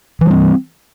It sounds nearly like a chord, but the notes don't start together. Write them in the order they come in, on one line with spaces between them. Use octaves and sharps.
E3 G3 C4